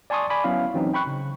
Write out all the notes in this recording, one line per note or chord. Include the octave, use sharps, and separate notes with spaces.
D5 G#5 A5 C6 C#6 D#6
D5 G#5 B5 C#6 D6
F#3 B3 C#4 E4 F5
E3 F#3 C4 C#4 D#4
G5 B5 C#6 F#6
C#3